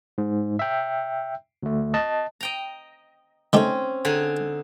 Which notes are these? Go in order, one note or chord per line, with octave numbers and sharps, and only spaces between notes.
G#2
E5 G5
D2 A3
D#5 A5
D#5 G5 A#5
D#3 A3 C4 C#4 G4
D3 D#4 G#4